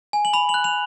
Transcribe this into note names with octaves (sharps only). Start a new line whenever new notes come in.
G#5
F#7
B5 F7
F#7
F#6
F7